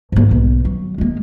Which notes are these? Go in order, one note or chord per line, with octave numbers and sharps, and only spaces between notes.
G#2 A#3
B1
F#3
G#3 A#3